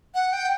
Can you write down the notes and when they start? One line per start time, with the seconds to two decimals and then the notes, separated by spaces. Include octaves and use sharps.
0.15 F#5
0.33 G5